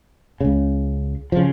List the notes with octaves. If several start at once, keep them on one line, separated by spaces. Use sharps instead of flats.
C#2 C#3
F3
C#3